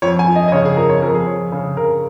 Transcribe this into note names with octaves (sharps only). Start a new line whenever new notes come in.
F2 C#5
G#5
F3
D#5
D#5
C#3 C#5
G#4
F2 A#4
C#5
F2 A#4
G#4
F2 C#5
C#3 G#4
C#3 A#4